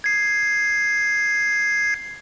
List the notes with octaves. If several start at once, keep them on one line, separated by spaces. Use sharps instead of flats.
G#6 C7